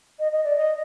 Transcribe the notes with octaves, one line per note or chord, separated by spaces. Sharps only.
D#5
D#5
D5
D#5